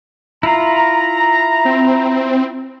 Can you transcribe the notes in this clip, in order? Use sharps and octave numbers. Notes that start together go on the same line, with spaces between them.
E4 F4 A#5
C4